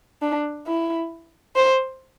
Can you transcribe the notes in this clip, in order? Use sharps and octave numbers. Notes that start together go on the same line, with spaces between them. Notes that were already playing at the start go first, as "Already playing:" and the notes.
D4
E4
C5